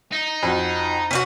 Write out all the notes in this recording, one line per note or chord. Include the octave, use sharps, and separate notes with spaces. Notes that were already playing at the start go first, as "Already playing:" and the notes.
D#4
F2 F#4
C#4 D4 F#4 B6